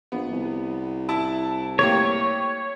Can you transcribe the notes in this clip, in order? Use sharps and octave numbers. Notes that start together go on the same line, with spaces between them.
A#1 B3
C2
E4 A5
A3 A#3 G4 C#5